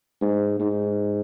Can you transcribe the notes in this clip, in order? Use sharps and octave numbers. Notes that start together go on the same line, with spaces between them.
G#2
G#2